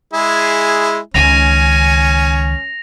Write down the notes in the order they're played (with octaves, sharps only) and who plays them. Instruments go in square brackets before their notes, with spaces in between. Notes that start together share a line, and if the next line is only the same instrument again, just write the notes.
[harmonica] G#3 E4 G#4
[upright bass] C#2 D#3 [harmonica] C#4 [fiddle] G#5 [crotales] A#6 F7